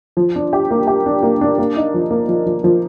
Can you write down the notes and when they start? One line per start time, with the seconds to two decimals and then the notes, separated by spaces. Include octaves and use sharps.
0.17 F3
0.35 D4
0.53 G4
0.71 A#3
0.87 G4
1.06 D4
1.23 A#3
1.41 D4
1.58 A#3
1.77 D#4
1.94 F3
2.11 A#3
2.29 F3
2.46 F3
2.64 F3